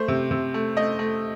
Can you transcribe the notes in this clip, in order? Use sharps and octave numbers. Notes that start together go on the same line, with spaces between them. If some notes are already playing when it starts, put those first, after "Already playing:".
Already playing: A3 C5
C3
C3
A3
A3 D#5
A3